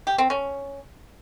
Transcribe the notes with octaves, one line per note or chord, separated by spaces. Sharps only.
G4
C4
C#4